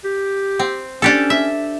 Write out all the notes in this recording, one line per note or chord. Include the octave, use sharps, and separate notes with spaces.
G4
C4
C#4 D4 G4 A4
E5